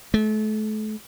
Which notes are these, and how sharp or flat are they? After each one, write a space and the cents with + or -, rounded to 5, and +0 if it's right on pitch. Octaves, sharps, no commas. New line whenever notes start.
A3 -35